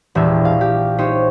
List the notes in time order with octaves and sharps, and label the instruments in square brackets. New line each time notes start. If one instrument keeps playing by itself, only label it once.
[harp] E1 A#1 G4 E5
F5
G4
D#4 G4 C5 C#5